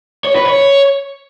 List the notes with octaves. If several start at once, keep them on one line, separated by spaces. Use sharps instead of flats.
C#5
B4
C#5